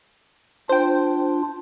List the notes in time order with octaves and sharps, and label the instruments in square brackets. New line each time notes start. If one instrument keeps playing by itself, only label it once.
[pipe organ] D4 F4 [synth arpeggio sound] C5 G5